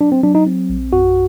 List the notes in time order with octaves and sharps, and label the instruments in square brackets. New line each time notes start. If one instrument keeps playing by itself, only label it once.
[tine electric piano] F#3 D4
C4
F#3 D4
D#4
C4
A#1
F#2 F#4